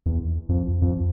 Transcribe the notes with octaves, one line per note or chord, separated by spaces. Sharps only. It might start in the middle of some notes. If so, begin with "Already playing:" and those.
E2
F2
F2